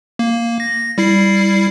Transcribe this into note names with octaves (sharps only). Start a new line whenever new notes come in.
A#3
A#6
G3 E4 C7